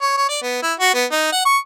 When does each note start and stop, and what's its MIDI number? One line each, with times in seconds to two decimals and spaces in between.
0.01 0.16 73
0.17 0.26 73
0.29 0.38 74
0.42 0.58 59
0.63 0.73 64
0.80 0.94 66
0.94 1.05 59
1.12 1.28 63
1.32 1.44 78
1.45 1.58 85